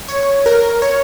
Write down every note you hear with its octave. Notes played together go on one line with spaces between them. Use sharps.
C#5
A#4
C#5